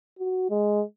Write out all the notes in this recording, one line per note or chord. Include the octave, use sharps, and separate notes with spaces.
F#4
G#3